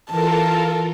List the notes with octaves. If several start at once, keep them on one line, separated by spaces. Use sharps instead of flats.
E3 F4 A4 A#4 A5